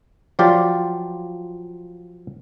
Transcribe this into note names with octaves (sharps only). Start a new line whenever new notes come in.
F3 F#3 F4 G4 D5